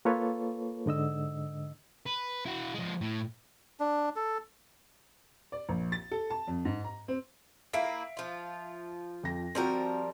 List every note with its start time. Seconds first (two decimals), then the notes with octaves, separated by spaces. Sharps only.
0.05 A#3 F4 A4 B4 C#5
0.86 G#2 D3 D#5 E6
2.06 B4
2.46 E4 F#4
2.75 F3 G#3
3.01 A2
3.80 D4
4.16 A4
5.52 D5
5.69 A#1
5.92 A6
6.12 A4
6.30 A5
6.48 F2
6.65 G#2
6.84 A#5
7.08 C4
7.73 A#3 E4 E5 F5 D7
8.17 F3 F4
9.23 F2 A#6
9.55 F3 G3 C4 F#4 A#4